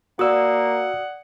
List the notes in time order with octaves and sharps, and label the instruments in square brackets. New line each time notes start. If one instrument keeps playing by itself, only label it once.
[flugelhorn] A#3 [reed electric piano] F#4 E6 [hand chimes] D5 D#6 [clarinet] F#5